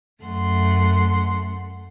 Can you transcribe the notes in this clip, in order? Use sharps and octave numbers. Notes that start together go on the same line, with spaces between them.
F#2 A3 F#5 C6